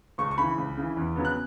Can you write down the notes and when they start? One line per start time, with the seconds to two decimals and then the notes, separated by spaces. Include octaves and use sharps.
0.18 C#2 C#6
0.31 C#6
0.38 C#3 E3 B5
0.58 C#2
0.77 C#3 E3
0.97 E2
1.16 C#3 F#3 B3
1.25 F#6